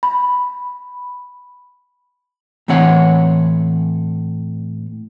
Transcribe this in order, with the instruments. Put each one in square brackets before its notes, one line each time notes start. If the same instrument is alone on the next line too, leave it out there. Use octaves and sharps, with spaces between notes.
[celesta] B5
[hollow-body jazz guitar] A2 E3 C4 C#5 F#5